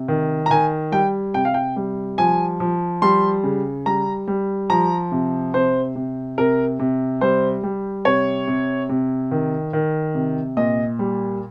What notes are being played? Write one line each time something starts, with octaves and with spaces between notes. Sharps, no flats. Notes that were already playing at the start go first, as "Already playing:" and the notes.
Already playing: C3
D#3
A#5
D#3 G#5
G3 G5
C3 G5
F5
G5
G3
F3 G#5
F3
G3 C6
C#3
G3 A#5
G3
F3 A#5
C3
C3 C5
C3
C3 A#4
C3
G3 C5
G3
C3 C#5
C3
C3
D#3
D#3
C3
A#2 D#5
G3